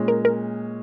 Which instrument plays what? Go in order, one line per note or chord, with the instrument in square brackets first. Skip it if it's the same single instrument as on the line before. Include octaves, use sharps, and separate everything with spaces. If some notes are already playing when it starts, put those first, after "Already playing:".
Already playing: [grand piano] A#2 G#3 C#4
[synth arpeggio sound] A#4
A#4